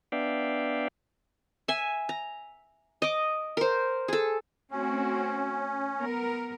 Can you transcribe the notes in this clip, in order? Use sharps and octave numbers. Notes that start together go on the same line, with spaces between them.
B3 D4 D5 E5 F5 G5
E5 G#5
A#5
D#5 D6
A#4 C5
G#4 A4
A3 C4 C#4 F#4
B3 A#4